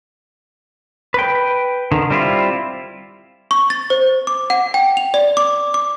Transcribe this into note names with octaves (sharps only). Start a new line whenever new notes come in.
B4 G5
D3 D#3
G3 C4 E4 F4
C#6
A6
C5
D6
F#5
G5
F7
D5
D6
D6